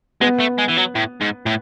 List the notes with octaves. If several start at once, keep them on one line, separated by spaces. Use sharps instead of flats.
G#3 B3
A3
G#3
E3
F#3
A2
G#2
A2